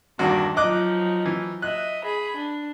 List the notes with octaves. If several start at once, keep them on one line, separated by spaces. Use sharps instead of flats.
E2 G2 D#3 D4 F#4
F3 F#3 D#4 D#5 D6 F#6
E3
D#5 E5 F#6
G#4 B5
D4